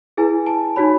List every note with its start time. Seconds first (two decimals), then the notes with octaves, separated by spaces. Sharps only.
0.17 E4 G#4 B4 G#5
0.47 A5
0.76 D#4 F#4 C#5 B5